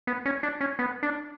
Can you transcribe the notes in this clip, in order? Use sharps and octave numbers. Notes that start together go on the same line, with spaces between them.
B3
C#4
D4
C#4
B3
D4